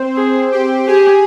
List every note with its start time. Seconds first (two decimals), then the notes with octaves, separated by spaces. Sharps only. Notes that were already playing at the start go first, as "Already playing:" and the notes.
Already playing: C4 C5
0.16 G#4
0.52 G4 G5
0.87 G4 G#4 G#5